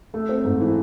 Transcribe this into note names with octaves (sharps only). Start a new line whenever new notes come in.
A3
C4
G#2
E3